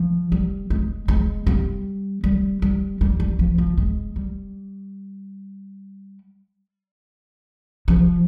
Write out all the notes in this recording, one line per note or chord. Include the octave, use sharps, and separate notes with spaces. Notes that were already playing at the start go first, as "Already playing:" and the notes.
Already playing: F3
G3
G#3
G#3
G3
G3
G3
G3
G3
F3
F3
G#3
G3
F3